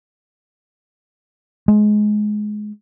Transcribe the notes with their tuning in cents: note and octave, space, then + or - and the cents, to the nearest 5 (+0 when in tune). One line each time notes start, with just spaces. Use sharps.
G#3 +20